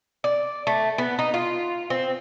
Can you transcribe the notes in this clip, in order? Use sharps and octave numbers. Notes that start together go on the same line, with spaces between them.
D5
A3
B3
D#4
F4
C4